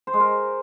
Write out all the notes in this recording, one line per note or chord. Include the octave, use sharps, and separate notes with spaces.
C5
G#3
A#4